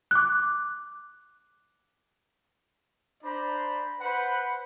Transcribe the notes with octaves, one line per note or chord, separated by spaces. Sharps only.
D6 F#6
D4 C5 D5 A#5 B5
B4 C5 F#5 B5